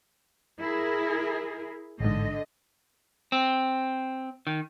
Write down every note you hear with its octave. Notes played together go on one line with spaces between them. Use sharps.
E4 G#4 A#4
A1 G#2 D3 D#5
C4
D#3